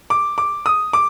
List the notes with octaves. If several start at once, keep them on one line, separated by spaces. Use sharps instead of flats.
D6
D6
D#6
D6